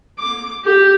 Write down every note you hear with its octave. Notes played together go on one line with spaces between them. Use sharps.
D6
G4